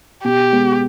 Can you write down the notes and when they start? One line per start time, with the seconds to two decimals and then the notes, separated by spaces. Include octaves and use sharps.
0.24 B2 G4
0.52 G#3 B3